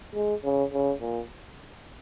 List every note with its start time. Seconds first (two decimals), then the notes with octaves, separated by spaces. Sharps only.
0.15 G#3
0.44 C#3
0.73 C#3
1.01 A#2